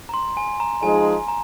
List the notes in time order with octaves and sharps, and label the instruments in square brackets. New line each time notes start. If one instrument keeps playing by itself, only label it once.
[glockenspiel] A#5
C6
G#5
A#5
[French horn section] F3 G#3 D#4 G#4 D#5 [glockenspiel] G#5
[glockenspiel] A#5